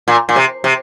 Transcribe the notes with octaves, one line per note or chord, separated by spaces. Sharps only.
A#2
A#2
C3
C3